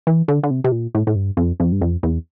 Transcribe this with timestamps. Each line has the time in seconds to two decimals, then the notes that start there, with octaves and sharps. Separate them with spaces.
0.07 E3
0.28 D3
0.43 D3
0.51 C3
0.64 C3
0.72 A#2
0.95 A2
1.07 A2
1.16 G2
1.37 F2
1.60 F2
1.72 G2
1.81 F2
2.03 E2